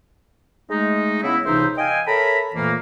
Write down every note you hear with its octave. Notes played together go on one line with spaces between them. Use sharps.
G#3 A3 D#4
C#3 B3 C#4 E4
C#2 C3 E3 D#4 C5 E5
D#5 F5 G5 G#5
A4 A#4 C#5 E5 A#5 B5
F2 A#2 E3 A3 A#3